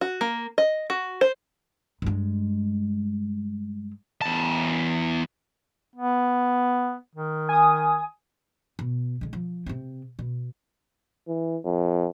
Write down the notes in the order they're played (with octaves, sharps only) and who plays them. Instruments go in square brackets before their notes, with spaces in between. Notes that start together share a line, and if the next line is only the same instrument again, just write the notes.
[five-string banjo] F#4
A#3
D#5
F#4
C5
[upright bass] G2 G#3
[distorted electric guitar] E2 A5
[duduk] B3
D#3
[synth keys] G#5 D#6
[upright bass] B2
D3 G#3
F3
C3 C4
B2
[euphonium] E3
F2